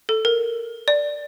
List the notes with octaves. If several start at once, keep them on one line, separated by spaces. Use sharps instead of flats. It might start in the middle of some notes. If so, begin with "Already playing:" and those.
A4
A#4
D5